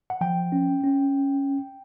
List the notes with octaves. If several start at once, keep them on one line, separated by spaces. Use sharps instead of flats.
F#5
F3 G5
C#4
C#4